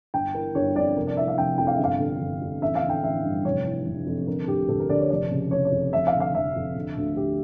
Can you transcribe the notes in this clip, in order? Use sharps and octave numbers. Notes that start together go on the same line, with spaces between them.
G1 G5
E3 A#4
G1 C#5
F2 D5
F1 A#4
D5
E3 E5
F5
F1 G5
F2 G5
F5
E5
G1 F5
D3
G1
F2
A1 E5
F5
D3
G5
A1 E5
G2
F1 C#5
E3
F1
F2
D3 A#4
D2 G4
D2 A4
A#4
D3 D5
C#5
F1 D5
C#3
F1 C#5
C#5
F2
F1 E5
F5
D3
F5
F1 E5
F2
D3
D2
D2 G4